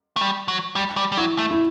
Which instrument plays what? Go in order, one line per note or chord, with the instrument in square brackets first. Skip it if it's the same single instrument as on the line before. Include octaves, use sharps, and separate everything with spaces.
[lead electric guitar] A3
G3
F#3
G3
G3
G3
[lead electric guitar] F#3 [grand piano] E4
[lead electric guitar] A3
[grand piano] E4